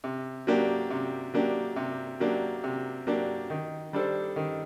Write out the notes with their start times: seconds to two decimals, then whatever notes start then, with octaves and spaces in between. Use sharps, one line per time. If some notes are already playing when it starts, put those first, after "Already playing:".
0.04 C3
0.47 F#3 A#3 D4 G4
0.91 C3
1.34 F#3 A#3 D4 G4
1.76 C3
2.20 F#3 A#3 D4 G4
2.64 C3
3.07 F#3 A#3 D4 G4
3.50 D#3
3.93 G3 D4 A4 C5
4.36 D#3